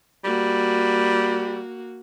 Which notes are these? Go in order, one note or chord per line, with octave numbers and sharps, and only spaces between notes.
G3 A#3 F#4